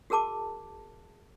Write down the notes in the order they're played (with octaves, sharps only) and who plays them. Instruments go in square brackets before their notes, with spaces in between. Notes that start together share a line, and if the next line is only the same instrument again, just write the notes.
[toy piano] F#4 G#4 A#4 A5 D6